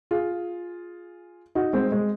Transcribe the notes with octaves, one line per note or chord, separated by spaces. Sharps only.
F4 G#4
D#4 F#4
G#3 C4
G#3